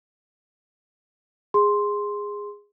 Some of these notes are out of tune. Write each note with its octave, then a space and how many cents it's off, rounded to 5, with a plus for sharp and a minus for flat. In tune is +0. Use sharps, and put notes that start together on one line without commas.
G#4 -15 C6 +0